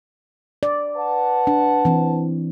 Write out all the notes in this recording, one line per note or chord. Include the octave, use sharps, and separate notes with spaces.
D5
B4 F#5 A5
D4
E3 C4